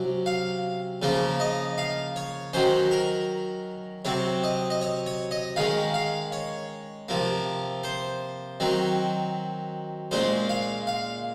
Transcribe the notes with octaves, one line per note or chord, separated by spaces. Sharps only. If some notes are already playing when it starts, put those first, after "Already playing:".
Already playing: C3 F#3 C#4
F5
C#3 F3 A#3 C#4
D#5
F5
C#5
D#3 F#3 C#4 C5
A#4
C3 F#3 C4 C#5
D#5
D#5
C#5
C#5
D#5
D#3 G#3 C#4 F5
F5
C#5
C3 F3 A#3
C5
D#3 F#3 C4
A#2 G#3 C#4 C5
F5
F5